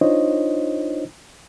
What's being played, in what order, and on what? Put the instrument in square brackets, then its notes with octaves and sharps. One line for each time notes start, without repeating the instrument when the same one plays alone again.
[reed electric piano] D4 D#4 F4 C5 C#5 D#5